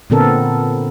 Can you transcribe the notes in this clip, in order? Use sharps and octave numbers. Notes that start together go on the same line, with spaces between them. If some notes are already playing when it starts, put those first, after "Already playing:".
A#2 D3 B3 C4 A4 A#4